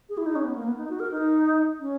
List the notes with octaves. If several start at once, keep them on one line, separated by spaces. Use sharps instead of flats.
G#4
E4
D#4
C#4
B3
A#3
B3
D#4
F#4
A#4
D#4
C#4